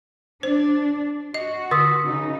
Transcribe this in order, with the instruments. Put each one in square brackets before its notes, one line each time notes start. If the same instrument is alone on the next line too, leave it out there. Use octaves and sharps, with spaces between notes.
[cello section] D4 [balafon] C5
[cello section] F#4 [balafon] D#5
[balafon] D3 [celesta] D#6 E6 B6
[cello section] C#3 D#4